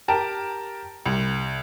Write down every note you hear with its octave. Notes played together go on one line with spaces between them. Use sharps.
G4 A#4 A5
C2